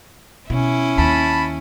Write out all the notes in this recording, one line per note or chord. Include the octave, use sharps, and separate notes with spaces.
B2 C#4 E4
D#2 A5 B5